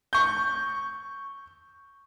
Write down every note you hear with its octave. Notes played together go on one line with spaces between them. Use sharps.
C#6 G6